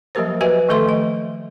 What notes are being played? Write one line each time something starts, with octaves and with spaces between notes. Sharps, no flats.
F3 F#3 A#3 G4 A#4 C5
F#4 G4 B4 D#5 E5 G#5
D#3 F3 A3 A4 E5 C6
D#5